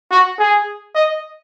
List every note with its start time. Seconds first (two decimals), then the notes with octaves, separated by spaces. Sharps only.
0.11 F#4
0.39 G#4
0.95 D#5